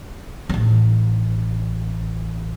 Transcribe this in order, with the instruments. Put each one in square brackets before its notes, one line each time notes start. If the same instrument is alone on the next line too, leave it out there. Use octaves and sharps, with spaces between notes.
[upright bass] A1 D#4